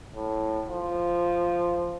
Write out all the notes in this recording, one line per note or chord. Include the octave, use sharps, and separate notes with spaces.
A2
F3